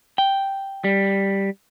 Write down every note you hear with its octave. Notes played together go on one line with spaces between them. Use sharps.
G5
G3